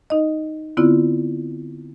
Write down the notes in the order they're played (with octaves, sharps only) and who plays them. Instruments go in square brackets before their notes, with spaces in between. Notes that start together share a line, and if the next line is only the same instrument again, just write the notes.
[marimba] D#4 D#5
D3 B3 C4 E4 F4